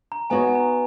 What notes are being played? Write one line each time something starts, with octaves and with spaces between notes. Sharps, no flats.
A#5
B3 D#4 F#4 C#5 G#5
G#5
A#5